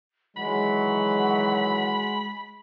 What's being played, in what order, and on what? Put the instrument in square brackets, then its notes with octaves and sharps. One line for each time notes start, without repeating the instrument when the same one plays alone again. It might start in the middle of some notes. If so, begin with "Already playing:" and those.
[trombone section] D#3 E3 F#3 [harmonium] G#3 [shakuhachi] F#5 [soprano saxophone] B5